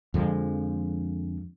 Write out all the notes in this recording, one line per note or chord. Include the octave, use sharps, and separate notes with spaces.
F2 D3 F3 G#3